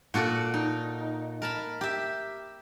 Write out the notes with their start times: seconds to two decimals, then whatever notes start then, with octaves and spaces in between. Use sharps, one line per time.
0.14 A#2 F#4 A4 D5
0.54 D#4
1.42 A#4 A5 B5
1.81 G4 E5